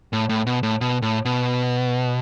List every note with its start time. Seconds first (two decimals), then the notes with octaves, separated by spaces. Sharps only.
0.13 A2
0.29 A2
0.47 B2
0.63 A2
0.81 B2
1.02 A2
1.25 B2